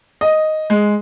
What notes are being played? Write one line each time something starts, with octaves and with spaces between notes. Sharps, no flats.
D#5
G#3